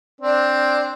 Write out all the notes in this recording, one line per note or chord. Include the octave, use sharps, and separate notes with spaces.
C4 D4